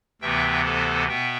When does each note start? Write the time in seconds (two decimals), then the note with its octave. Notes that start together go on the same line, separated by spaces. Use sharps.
0.21 D2 C3 E3 B3 E5 G5
0.65 A4 C5
1.09 B2 B3 E5 G5